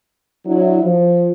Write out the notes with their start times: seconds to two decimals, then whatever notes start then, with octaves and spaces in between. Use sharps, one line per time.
0.46 F#3 D4 E4
0.83 F3